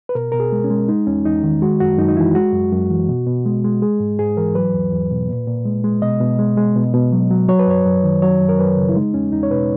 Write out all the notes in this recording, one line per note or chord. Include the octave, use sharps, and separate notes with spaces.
B4
B2 A#4
B2 A#4
G#4
G#3
C#4
G#3
G#3 D#4
E2 C#4
E2 D#4
D#3
G#3 F#4
F#2 F#4
F#2 D#4
D#4
E3 E4
G#3 F#4
F#2
F#2
E3
B2
B2
G#3
G#3
G#3 G#4
G#2
G#2 G#4
E3 A#4
F#3 B4
E2
E2
B2
A#2
A#2
G#3
G#3
B2 D#5
B2
G#3
G#3
B2
B2
F#3
F#3
F#3 C#5
B4
F#2 C#5
F#2
D#3
F#3 C#5
F#2
A#4
F#2 B4
C#3
E4
G#3 D#4
E2 C#4
E2 D#4
C#5
B2 B4